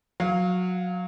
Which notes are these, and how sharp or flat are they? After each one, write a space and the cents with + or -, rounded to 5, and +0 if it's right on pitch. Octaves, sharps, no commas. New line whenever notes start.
F#3 -20 F5 +0